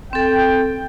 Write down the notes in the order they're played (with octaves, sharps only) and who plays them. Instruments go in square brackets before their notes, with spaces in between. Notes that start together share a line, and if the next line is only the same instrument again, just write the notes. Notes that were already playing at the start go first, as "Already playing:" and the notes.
[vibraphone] C4 A4 [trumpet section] G5